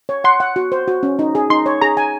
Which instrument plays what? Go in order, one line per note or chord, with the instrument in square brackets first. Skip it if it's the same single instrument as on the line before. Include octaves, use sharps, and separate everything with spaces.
[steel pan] C#5
[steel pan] F#5 [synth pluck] C6
[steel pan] F#5
F#4
C5
F#4
C#4
D#4
G#4
[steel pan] D#4 [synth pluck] C6
[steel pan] C#5
[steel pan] G#4 [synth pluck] A#5
[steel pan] G#5